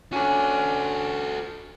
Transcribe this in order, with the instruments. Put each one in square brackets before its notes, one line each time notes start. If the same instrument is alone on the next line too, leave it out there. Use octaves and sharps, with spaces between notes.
[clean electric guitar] C#4 D4 [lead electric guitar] F#4 A4